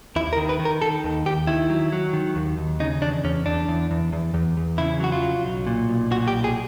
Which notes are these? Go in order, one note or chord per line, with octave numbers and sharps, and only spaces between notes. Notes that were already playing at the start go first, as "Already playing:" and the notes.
D#2 E4
A#4
D#3
B4
D#3
A#4
D#3 A4
D#2
D#2 G4
D#3 E4
F#3
F#3
D#3
D#2
D#2
C#3 D#4
E2 D4
E2 C#4
E2 D4
E2
E2
E2
E2
E2
C#3 E4
F#3 F#4
F4
F#3
B1
A#2
B1
A#2 F#4
G4
B1
G#4